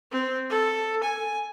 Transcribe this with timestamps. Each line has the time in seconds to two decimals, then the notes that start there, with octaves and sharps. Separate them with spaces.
0.11 C4
0.50 A4
1.03 G#5